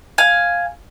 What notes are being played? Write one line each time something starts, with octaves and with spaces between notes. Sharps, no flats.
F5 G#5